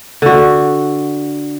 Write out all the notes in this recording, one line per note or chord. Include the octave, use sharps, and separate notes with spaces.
D3 F#4